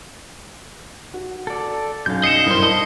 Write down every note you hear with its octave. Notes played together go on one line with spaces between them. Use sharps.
F#4
A4 D5
B1 F#2 F5 G6
D#5 C7 C#7 E7
G2 E4 A#4 C5 D5
D#5 A5